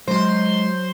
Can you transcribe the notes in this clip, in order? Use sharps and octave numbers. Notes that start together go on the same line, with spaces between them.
F#3 G#3 C5 C6